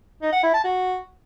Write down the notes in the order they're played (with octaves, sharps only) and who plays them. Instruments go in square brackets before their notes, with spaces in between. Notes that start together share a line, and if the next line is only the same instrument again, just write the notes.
[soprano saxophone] D#4
F#5
E4
A5
F#4